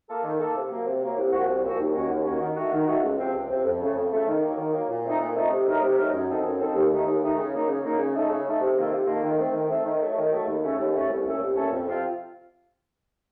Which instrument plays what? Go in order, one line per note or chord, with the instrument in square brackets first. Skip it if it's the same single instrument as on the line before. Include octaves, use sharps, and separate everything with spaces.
[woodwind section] A#3 F4 A4
D#3
A#3 F4 A4
C3
F#3 A#3
C3
F#3 A#3
C2
A#2 F3 C4 F#4
C2
A#2 F3 C4 F#4
D#2
D#3 A#3 C#4 F#4
D#2
D#3 A#3 C#4 F#4
D#3
A3 D#4 F#4
D#3
A3 D#4 F#4
C#2
C3 F3 C4
C#2
C3 F3 C4
F2
C#3 A3
F2
C#3 A3
D#3
A#3
F#3
D#3
F#3 A#3
A#2
A3 C4 D#4
A#2
A3 C4 D#4
C3
F#3 A3 D#4 A#4
C3
F#3 A3 D#4 A#4
F#2
F3 C4 D#4 A4
F#2
F3 C4 D#4 A4
D#2
D#3 A3 D#4
D#2
D#3 A3 D#4
C#3
F#3 A#3 D#4
C#3
F#3 A#3 D#4
C#3
A3 D#4 A4
C#3
A3 D#4 A4
C3
D#3 A#3 F4 A4
C3
D#3 A#3 F4 A4
D#3
A3 C4
D#3
A3 C4
D#3
F#3 A3
D#3
F#3 A3
D#2
C#3 A3 C#4 A4
D#2
C#3 A3 C#4 A4
C2
A#2 A3 C#4 A4
C2
A#2 A3 C#4 A4
F2
C3 F3 C4 F4